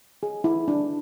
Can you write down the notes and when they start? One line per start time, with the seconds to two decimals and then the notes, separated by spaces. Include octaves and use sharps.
0.23 G#4
0.44 E4
0.68 D4